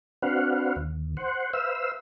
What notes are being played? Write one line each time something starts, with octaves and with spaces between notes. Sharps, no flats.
C4 D4 F#4 B4 F5 F#5
D#2
C5 F#5
B4 C5 E5 F5 E6